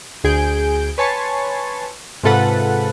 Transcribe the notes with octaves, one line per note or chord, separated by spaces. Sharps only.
D2 G#4 G6 D7
B4 C#5 G#5 A5 C6 C#6
G#2 C3 F4 A4 B4 F#5